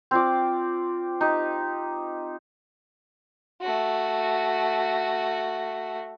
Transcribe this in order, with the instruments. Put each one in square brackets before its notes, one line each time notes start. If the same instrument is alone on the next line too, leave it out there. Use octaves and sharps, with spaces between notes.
[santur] C4 F4 D5
D#4 G4
[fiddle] A3 F#4